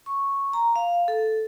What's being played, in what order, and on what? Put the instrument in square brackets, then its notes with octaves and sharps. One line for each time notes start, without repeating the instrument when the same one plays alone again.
[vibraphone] C#6
A#5
F5
A4